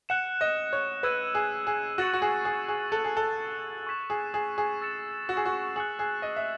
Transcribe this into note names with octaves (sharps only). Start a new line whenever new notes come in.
F#5 F#6 C#7 E7
D#5
C#5
B4 E6 G#6 D#7
G#4
G#4
F#4 C#6 E6 A6 C#7 F#7
F#4
G#4
G#4
G#4
A4 F#6 C#7 F#7
G#4
A4
C#6 G#6 B6 E7
G#4
G#4
G#4
E6 A6 C#7 E7
F#4
G#4
F#4
G#4 F#6 C#7 F#7
G#4
D#5
E5